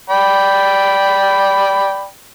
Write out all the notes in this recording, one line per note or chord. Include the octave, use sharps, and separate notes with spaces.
D5 G5 B5